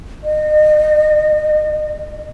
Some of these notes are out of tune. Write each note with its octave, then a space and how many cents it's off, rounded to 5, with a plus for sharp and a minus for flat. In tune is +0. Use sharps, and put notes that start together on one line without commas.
D#5 -35